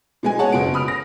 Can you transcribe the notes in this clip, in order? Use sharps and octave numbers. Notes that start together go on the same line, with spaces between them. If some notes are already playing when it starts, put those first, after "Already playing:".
B2 G#3 G#5
G#4 C#5 F#5 A5
F#1 B2 D7
B5 D#6 F6
A#6